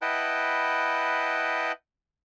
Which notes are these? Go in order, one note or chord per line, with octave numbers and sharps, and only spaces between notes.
E4 B4 D#5 F#5 G5 A5